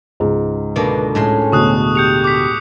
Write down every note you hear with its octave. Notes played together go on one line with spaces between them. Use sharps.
C#2 G#2
B2 D3 A#3 B4
A2 G#3 C#4 C6
D2 B2 C#6 D#6 F#6
G4 G6 C#7 F7
D6 B6